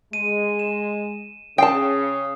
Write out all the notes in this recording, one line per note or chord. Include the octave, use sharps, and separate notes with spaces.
G#3 D#7
E7
C#3 G5 A5 D#6 C7